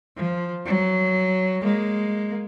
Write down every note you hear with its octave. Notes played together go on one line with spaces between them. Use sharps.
F3
F#3
G#3 A#3